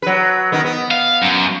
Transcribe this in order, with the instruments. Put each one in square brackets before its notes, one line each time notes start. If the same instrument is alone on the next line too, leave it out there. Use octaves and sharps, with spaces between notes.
[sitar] F#3 B4
D#3 B3
B3
[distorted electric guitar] F5
F#2